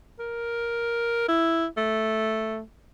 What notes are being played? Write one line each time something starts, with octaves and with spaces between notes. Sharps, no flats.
A#4
E4
A3